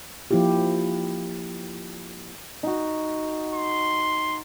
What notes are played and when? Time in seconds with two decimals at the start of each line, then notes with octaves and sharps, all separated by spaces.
0.31 F3 A#3 E4 F4 G4
2.63 D#4 F#4
3.54 C6